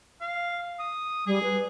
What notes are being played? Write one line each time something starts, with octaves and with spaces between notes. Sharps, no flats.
F5
D#6
G3 G#4
B4